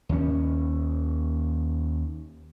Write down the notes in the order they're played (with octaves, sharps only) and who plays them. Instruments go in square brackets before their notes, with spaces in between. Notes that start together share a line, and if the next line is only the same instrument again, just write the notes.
[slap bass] D#2 C#4